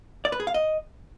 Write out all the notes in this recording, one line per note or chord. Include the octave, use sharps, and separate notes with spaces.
D5
B4
G#4
F5
D#5